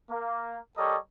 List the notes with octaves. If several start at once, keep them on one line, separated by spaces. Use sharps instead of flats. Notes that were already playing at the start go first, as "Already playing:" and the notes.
A#3
G3 G4 A4 A#4 C#5 D#5